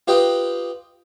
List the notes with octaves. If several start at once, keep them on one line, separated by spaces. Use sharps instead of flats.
F4 G4 B4 D#5 G5